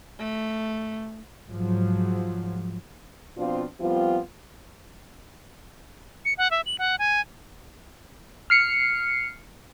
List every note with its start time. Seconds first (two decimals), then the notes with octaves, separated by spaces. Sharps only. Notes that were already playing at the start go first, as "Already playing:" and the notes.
0.19 A3
1.49 G#2 F3 F#3
3.37 B2 F3 C4 D4 F4
3.81 F3 G3 B3 C4 F4
6.25 C#7
6.38 F#5
6.51 E5
6.66 F#7
6.79 F#5
6.99 G#5
8.50 F6 C7 C#7